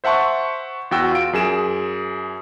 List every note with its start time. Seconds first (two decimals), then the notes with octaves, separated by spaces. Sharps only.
0.04 C5 E5 F#5 A5 C6 C#6
0.91 E2 F#4 G5 E6
1.12 F4 D7
1.33 F#2 G#4 E7